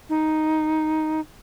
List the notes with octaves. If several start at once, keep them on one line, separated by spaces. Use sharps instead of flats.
D#4